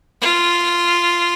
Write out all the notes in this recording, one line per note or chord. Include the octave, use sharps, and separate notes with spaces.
F4